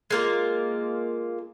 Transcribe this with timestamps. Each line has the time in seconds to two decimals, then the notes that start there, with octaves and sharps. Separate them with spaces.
0.10 G#3 A#3 F4